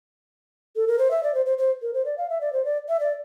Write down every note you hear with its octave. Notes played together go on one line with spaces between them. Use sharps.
A4
A#4
C5
E5
D5
C5
C5
C5
A#4
C5
D5
F5
E5
D5
C5
D5
E5
D5